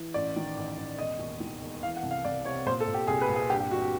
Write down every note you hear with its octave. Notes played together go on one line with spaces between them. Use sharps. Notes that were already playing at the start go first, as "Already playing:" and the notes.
Already playing: E3
A1 D5
D#3
A1
A1
E1 D#5
D#2
D#3
E1
E3 F5
F#5
C2
F5
C2 D5
C3 C#5
A#2 C5
A4
A#2
G4
C2 G#4
B4
A#2
G#4
G2 G4
G4
G1 F#4
G4